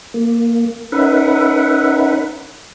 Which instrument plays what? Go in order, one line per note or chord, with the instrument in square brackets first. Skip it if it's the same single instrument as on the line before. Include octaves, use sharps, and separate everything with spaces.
[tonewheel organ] A#3
C#4 D#4 A#4 B4 E5 F#5